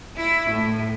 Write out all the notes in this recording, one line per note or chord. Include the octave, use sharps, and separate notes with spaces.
E4
A2